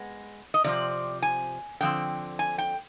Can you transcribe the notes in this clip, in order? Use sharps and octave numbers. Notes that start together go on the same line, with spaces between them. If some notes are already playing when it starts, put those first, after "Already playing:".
Already playing: G#3 B3
D#5
C3 F3 C4 D5
G#5
D3 F3 C4 G5
G#5
G5